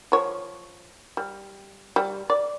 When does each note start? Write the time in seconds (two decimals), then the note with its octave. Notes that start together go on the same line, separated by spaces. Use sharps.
0.12 F3 C#5
1.17 G3
1.96 G3
2.30 D5